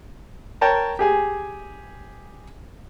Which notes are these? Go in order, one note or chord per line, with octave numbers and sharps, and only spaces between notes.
A#4 C#5 G5 A5 A#5
G4 G#4 G#5